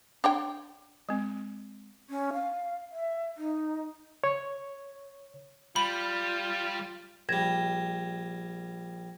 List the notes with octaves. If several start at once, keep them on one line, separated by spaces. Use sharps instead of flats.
D4 C#5 G5
G#3 C4
C#4
F5
E5
D#4
C#5
G3 F4 B5
A#1 G3 G#6 A#6 E7